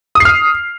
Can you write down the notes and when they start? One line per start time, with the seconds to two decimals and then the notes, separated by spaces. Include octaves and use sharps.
0.15 D#6
0.20 C7
0.25 F6